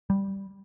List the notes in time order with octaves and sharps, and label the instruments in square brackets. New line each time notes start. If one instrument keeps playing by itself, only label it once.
[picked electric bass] G3